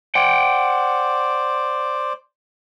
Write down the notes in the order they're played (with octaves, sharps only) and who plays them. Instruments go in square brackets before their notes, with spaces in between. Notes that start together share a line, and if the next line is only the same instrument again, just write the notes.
[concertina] C5 D5 [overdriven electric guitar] F#5 G5